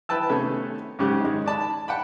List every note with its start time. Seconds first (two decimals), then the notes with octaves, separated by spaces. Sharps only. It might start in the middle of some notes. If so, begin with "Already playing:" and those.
0.09 E4 B4 G5 A5 E6
0.30 C3 D#3 A3 B3 C#4
0.99 G#2 C#3 C#4 G4 F#6
1.20 D#3 G#3
1.46 D5 A5 B5
1.88 F#5 G5 B5